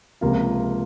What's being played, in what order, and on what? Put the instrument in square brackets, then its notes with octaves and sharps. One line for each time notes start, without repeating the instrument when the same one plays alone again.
[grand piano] C#2 C3 F3 A#3 F4